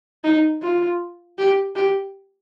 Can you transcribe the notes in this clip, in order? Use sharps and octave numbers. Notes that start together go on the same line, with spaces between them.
D#4
F4
G4
G4